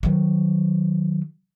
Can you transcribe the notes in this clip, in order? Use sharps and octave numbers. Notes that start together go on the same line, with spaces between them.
D#3 F#3